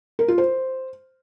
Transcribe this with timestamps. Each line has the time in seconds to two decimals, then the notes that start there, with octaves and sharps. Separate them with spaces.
0.19 A#4
0.28 F4
0.38 C5